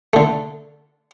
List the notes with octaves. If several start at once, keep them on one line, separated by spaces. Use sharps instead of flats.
D3 A3